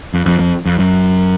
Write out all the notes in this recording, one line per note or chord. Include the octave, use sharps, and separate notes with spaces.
F2
F2
F2
F2
F#2